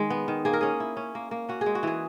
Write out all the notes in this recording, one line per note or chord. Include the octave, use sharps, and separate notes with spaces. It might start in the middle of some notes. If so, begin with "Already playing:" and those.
Already playing: D#3 G#3
B3
D#3
A#3 G#4
A#4
C#4 G#4
E4
C#4
A#3
A#3
C#4 F#4
G#4
G#3
F#4
E3 G#4